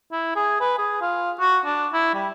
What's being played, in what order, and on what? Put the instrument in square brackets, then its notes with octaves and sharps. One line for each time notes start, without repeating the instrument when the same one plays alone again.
[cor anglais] E4
G#4
B4
G#4
F4
F#4
D4
E4
G3